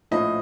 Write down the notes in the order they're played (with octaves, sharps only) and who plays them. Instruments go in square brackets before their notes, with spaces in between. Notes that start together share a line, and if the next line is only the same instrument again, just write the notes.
[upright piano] A#1 A2 F3 D#5